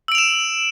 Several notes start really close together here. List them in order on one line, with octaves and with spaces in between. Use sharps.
E6 D7 F7 E7